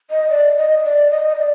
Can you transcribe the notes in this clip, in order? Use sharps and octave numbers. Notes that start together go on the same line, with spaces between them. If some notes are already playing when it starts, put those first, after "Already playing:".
D#5
D5
D#5
D#5
D5
D#5
D#5
D5